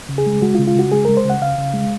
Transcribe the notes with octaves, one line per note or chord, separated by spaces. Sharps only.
C#3
G#4
G#3
G#3 F#4
F4
C#3
F4
C#3 F#4
G#3 G#4
G#3 A#4
C5
C#3 F#5
C#3 F5
C#3
G#3